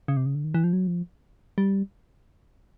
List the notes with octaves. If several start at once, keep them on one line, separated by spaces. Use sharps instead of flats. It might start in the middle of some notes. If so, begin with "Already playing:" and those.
C#3
C3
C#3
D3
D#3
E3
F3
F#3
F3
G3